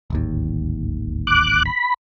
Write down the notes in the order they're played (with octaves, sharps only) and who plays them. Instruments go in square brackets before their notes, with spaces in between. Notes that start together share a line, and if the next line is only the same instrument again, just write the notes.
[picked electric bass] D1 G#1 D#2
[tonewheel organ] D6 F#6
B5